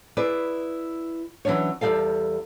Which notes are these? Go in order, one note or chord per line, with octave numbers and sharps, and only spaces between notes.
E4 G#4 B4 D5
E3 F#3 C#4 D4 C#5
E2 E3 G3 A4 F5